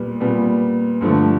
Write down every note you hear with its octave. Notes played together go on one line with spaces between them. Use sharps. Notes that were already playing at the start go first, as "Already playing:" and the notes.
Already playing: A#2 G3 B3
A#2 G3 B3
G2 D3 F3 A3